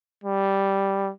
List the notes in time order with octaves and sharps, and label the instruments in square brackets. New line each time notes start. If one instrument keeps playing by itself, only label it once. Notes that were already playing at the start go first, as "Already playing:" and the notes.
[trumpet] G3